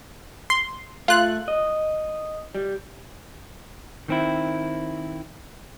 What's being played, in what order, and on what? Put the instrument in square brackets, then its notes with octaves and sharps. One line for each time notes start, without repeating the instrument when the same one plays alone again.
[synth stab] C6
[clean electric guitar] A3 [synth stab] F4 F#6
[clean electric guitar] D#5
G3
D#3 C4 E4